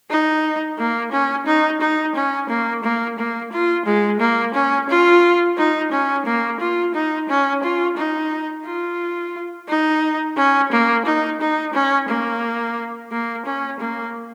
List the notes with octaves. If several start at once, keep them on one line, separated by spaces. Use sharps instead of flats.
D#4
A#3
C#4
D#4
D#4
C#4
A#3
A#3
A#3
F4
G#3
A#3
C#4
F4
D#4
C#4
A#3
F4
D#4
C#4
F4
D#4
F4
D#4
C#4
A#3
D#4
D#4
C#4
A#3
A#3
C#4
A#3